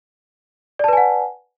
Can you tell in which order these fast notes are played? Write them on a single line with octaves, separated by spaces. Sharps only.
D5 A5 B4 G#5 F#5